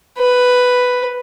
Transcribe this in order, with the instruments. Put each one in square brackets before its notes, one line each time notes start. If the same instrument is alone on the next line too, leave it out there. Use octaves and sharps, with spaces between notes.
[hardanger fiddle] B4